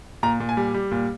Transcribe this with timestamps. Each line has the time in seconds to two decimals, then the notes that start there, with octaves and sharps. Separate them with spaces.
0.23 A#2 A#5
0.40 A#2
0.49 G#5
0.57 G3
0.74 G3
0.91 A#2